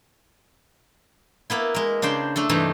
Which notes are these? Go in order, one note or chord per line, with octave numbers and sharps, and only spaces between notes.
A#3 B3 E4
G#3 A#4
C#3 D4 C5 G5
A3 D4 A4
G2 C3 E3 A3 D#4